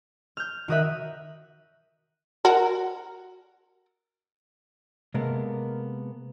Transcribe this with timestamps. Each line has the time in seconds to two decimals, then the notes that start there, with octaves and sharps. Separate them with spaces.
0.37 F6 G6
0.68 D#3 F#4 A#4 E5 D#6 F#6
2.45 F#4 A#4
5.14 C3 G#3 A#3 B3 A4 A#4